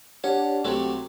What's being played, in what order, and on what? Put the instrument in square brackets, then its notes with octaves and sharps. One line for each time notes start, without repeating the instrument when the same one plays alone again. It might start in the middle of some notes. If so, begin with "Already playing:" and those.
[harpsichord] C#4 [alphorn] D4 [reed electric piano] G4 C#5 [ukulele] F#5
[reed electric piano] C2 [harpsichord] C3 F#3 A3 [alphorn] G4